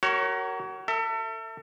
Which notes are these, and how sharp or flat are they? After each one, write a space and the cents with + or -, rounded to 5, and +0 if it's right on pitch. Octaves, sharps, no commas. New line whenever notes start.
F#4 +35 A#4 -10 C#5 +0
A4 +40 E5 +0